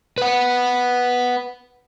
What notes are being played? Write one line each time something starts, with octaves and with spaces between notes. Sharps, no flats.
B4 F#5